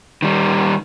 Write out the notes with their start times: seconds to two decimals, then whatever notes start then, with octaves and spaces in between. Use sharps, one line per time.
0.22 D#3 G3